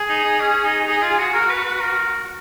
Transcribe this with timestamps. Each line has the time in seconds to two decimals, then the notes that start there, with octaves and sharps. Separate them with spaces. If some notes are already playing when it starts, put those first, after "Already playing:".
Already playing: G#4
0.09 D#4
0.25 D#4
0.40 C#4
0.63 D#4
0.86 D#4 G#4
1.02 F4
1.18 F#4
1.33 F#4 A#4
1.49 B4
1.65 B4
1.80 A#4